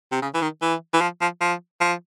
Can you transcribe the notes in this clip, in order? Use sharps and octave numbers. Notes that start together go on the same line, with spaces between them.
C3
C#3
E3
D#3
E3
E3
F3
F3
F3
F3